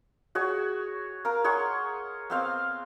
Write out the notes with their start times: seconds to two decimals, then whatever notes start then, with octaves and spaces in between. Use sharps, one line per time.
0.35 F#4 G#4 C#5
1.25 A#4 F5 A#5
1.44 G#4 C#5 F#5 C6
2.30 B3 C4 F5